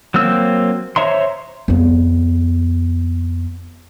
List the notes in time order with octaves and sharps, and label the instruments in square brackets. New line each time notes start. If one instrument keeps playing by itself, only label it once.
[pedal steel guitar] F#3 A#3 C4 E6
C5 C#5 E5 A#5 C6
[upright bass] F2 B3